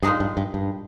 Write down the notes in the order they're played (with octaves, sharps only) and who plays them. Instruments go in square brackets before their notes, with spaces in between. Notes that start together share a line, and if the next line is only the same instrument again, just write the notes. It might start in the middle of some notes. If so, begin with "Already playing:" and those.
[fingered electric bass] G2 [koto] A#2 G#3 D#4 G#4
[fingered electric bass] G2
G2
G2